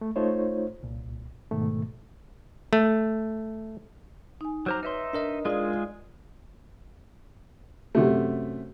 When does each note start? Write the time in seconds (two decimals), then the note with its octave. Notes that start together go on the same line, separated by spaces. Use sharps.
0.01 A3
0.16 A3 D#4 F4 C5 C#5
0.83 C2 A#2
1.51 G#2 B2 D#3 A3
2.73 A3
4.41 D#4 G#5
4.66 F#3 C5 A#5 D6 F6
4.83 D#4 B4 C#5 E5 C6
5.13 D4 A#4 D#5
5.45 G#3 F4 G#4 D5 F5
7.95 F#2 C3 A3